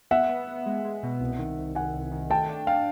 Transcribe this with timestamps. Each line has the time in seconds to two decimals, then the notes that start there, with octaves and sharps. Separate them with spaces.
0.11 B3 E5 F#5
0.29 B3
0.47 B3
0.66 G#3
0.84 G#3
1.03 B2
1.20 C2
1.39 D#3
1.58 C2
1.75 D#3 F#5 G#5
1.94 C2
2.12 D#3
2.30 A3 G5 A5
2.49 D4
2.67 D4 F5 G5